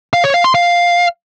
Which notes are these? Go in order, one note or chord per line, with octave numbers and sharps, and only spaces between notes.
F5
C#5
F5
C6
F5